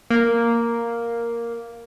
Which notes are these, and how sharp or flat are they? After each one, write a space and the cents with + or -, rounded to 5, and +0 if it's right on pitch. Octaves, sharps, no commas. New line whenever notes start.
A#3 +0